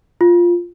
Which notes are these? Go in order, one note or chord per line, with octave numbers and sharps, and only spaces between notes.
F4